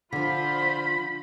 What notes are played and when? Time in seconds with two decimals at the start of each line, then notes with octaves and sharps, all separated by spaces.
0.12 D3 F3 F4 C5 B5